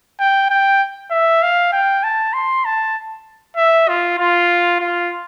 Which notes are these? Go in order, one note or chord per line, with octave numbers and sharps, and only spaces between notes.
G5
G5
E5
F5
G5
A5
C6
A5
E5
F4
F4
F4